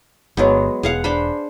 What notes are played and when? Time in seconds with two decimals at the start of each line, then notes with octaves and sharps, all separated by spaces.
0.37 G1 F#3 G#3 B3
0.83 E1 G#4 F5 F#5
1.04 D4 C5 B5